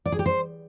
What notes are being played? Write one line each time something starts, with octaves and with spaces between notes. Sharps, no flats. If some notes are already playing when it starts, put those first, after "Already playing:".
D5
G#4
G4
C5